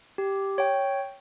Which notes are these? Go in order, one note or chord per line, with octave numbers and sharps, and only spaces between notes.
G4
C#5 G5